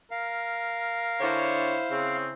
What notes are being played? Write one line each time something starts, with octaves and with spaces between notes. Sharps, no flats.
A#4 F5
D3 E4 C5 C#5
C#3 C4